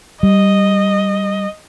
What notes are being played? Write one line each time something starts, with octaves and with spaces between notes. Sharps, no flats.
G3 D#5